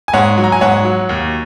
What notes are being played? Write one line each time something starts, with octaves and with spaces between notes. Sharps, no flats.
G#5
G#2 C#5 F#5
F#3
A#5
G#5
G#2 C#5 F#5
F#3
D#2